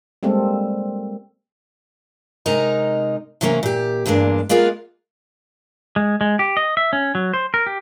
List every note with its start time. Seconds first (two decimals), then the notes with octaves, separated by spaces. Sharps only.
0.23 G3 G#3 A#3 C4 A4
2.46 C3 G#3 D#4 A#4 D#5 A#5
3.41 C3 E3 F#3 G3 A#3 C#4
3.63 A#2 G4
4.06 E2 G2 G#3 A#3 D4
4.49 G#3 A#3 B3 F4 G#4 A#4
5.96 G#3
6.21 G#3
6.39 G4
6.57 D#5
6.77 E5
6.93 C#4
7.15 F#3
7.34 C5
7.54 A#4
7.66 G4